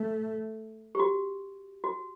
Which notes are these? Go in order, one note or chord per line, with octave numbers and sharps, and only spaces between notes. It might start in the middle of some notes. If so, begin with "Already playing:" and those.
Already playing: A3
G4
F#4
F#4